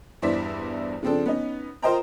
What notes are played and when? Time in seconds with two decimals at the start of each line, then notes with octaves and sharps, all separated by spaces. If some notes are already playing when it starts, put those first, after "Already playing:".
0.22 E2 G2 E4 C5 D5 B6
1.03 C#3 F3 C4 D4 A4
1.26 B3 C#4 D#4
1.82 F4 A#4 C5 D#5 G5 A#5